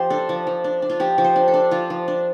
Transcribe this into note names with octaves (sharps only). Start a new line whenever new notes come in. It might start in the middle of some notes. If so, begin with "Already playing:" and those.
Already playing: F3 G4 C5
D4 A4
F3
F3
D4
D4
F4
F3 G4
F3
C5
D4
A4
D4
F3 F4
F3
D4